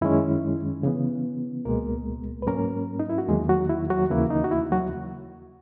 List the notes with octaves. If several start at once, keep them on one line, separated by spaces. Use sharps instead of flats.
F#2 D#3 G#3 C#4 E4
C#3 E3 B3
C#2 B2 G#3 A#3 A#4
B4
G#2 F#3 A#3 C#4 A#4
D#4
E4
F#4
E2 D#3 F#3 G#3 A#3 G#4
F#3 F#4
E4
F#3 F#4
D#2 C#3 E3 A#3 E4
D#4
F#4
E4
F#3 F#4